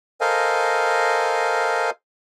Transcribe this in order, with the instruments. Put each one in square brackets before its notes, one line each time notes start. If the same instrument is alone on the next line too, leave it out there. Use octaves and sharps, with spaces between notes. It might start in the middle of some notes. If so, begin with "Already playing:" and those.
[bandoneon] A4 A#4 C5 D#5 F5 G#5